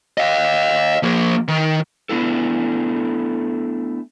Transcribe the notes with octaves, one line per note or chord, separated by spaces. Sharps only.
D#5 F5
F3 A#3
D#3
A3 B3 D4 E4 A4